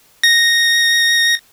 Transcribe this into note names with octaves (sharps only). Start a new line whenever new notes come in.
A#6